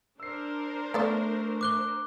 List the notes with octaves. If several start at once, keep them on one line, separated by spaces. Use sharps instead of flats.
D4 A#4 C5 E6 C7
A3 B3 A4 D5
D6 F#6 G7